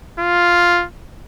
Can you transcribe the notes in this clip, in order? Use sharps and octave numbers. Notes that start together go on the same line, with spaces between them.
F4